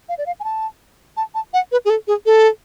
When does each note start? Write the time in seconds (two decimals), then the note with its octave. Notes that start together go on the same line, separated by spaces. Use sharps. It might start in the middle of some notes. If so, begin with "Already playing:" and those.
0.09 F5
0.18 D5
0.26 F5
0.40 G#5
0.44 A5
1.17 A5
1.35 A5
1.54 F#5
1.72 B4
1.85 G#4
1.90 A4
2.08 G#4
2.26 A4